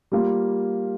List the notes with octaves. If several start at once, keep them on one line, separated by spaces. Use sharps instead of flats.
G3 A#3 F4